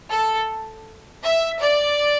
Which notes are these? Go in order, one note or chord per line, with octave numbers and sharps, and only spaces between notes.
A4
E5
D5